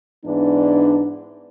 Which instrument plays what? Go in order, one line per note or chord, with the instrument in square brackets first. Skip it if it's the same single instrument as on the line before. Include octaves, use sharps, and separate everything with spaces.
[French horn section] G#2 E3 B3 D4